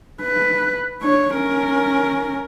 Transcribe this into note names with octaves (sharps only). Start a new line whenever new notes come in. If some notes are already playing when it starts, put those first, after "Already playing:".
B4
D4 C#5
C#4 A#4